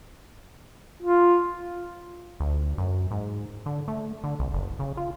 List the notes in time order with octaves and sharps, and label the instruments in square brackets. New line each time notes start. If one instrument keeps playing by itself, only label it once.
[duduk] F4
[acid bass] D2
F#2
G#2
D3
A3
D3
C2
F#1
C#3
F4